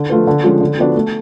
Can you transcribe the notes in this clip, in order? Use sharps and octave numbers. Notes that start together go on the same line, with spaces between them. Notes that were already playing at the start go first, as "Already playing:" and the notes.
Already playing: D3
F3 A3 F4 B4
D3
F3 G#3 C#4
D3
F3 B3 D4 F#4
A3